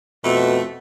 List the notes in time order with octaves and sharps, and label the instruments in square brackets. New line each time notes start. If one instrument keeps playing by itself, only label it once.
[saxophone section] F2 A3 [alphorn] B2